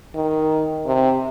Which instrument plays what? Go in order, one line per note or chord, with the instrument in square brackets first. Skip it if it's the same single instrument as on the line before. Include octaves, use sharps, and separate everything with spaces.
[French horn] D#3
C3